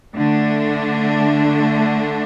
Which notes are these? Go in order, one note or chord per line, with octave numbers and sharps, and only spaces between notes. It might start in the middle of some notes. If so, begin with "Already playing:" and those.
D3 A3 D4